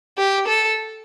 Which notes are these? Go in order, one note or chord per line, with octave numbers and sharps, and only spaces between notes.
G4
A4